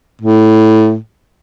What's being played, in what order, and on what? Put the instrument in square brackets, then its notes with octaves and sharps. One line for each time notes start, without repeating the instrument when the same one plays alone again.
[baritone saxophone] A2